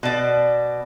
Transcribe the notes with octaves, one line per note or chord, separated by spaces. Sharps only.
B2 D5